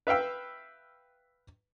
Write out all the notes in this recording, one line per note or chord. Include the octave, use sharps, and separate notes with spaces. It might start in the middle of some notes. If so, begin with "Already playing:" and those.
B4 E5 F5 G5 E6